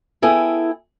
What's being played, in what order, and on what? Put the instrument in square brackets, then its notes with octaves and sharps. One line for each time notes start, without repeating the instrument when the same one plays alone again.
[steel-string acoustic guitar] B3 E4 G#4 A4 G5 G#5